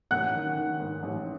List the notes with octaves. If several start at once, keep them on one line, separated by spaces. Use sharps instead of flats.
A1 F#5 F#6
D#3
D#3
G#2
A1